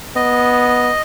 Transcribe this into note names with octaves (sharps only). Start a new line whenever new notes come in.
B3 D#5